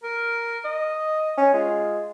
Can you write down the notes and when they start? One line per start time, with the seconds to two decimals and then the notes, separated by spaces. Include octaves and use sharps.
0.03 A#4
0.65 D#5
1.37 C#4
1.54 G#3 F4